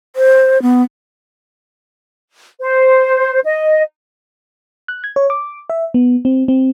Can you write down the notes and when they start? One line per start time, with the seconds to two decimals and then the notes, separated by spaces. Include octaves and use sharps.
0.16 C5
0.62 B3
2.61 C5
3.44 D#5
4.88 F#6
5.04 G#6
5.16 C#5
5.30 D6
5.70 E5
5.94 B3
6.25 C4
6.48 C4